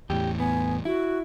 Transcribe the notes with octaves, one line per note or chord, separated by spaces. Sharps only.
E2 A2 G4
B3 G#5
E4 F#4